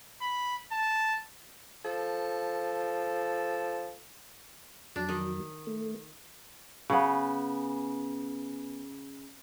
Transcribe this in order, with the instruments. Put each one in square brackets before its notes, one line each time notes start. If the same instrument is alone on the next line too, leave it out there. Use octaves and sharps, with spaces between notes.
[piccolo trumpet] B5
A5
[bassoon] F3 [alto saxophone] A4
[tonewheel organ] F2 F#3 [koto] D4
[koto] D#3
[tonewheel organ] A3
[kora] C#3 B3